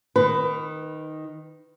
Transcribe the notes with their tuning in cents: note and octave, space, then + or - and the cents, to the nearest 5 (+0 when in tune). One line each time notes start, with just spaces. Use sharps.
D#3 +0 B4 +20